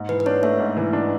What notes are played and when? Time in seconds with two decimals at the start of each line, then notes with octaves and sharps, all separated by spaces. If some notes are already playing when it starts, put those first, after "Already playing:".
Already playing: G#2
0.09 E3 B4
0.20 B4
0.26 D4 C#5
0.43 A3 E5
0.59 G#2
0.77 E3
0.93 D4